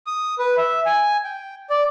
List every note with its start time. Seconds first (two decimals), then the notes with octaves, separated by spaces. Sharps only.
0.07 D#6
0.39 B4
0.57 E5
0.86 G#5
1.24 G5
1.70 D5